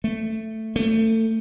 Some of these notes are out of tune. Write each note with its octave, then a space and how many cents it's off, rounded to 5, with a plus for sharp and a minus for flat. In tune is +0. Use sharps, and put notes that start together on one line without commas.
A3 +5
A3 +25